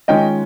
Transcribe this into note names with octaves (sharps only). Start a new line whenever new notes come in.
D#3 G#3 C#4 F4 D#5 G5